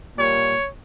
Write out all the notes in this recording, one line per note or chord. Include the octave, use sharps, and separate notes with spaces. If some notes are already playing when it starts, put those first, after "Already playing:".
A#2 G3 A#3 C#5